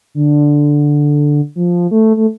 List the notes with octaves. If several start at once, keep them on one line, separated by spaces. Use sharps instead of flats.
D3
F3
A3
A3